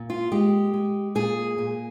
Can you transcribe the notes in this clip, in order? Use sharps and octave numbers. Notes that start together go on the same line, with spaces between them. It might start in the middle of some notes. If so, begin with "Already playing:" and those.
Already playing: A#2
F4
G#3 G4
G#3
A#2 G#4
A#2